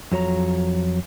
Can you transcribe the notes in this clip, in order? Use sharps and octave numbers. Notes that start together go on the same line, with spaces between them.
F2 F#3 C#5 A#5